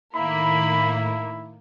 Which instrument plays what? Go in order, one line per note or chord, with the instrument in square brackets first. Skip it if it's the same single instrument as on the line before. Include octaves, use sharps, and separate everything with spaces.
[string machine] A2 D#3 [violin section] A#3 [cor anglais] E4 [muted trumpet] B5